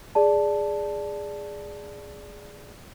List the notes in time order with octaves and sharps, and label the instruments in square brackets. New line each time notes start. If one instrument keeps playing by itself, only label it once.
[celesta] G#4 D5 A5